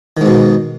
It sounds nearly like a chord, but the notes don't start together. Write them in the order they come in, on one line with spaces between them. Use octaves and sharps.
D#3 G#2 B2